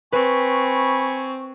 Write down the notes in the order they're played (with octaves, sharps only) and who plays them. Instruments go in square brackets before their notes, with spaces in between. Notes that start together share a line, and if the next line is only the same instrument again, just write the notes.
[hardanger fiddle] C4 [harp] B4 [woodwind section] G#5 B5 C#6